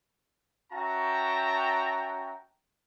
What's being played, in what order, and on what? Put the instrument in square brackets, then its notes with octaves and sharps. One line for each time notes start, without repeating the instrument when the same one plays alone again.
[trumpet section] C#4 F#4 E5 G5 A5 A#5